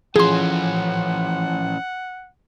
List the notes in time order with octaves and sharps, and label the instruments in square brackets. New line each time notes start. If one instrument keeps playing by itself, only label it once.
[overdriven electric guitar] E3 C#4 [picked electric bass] F3 [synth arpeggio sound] G#4 C6 [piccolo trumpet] F#5